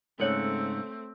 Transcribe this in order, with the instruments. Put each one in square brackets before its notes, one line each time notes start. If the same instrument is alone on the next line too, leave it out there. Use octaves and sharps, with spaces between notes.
[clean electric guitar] G#2 C#3 F#5 [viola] A3 C4 [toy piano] A4 C#5